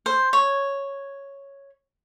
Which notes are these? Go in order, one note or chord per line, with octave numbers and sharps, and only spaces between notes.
C5
C#5